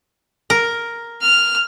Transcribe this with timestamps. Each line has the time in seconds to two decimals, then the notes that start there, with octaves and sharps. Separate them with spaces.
0.50 A#4
1.22 F6